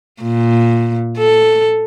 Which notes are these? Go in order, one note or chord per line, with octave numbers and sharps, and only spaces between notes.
A#2
A4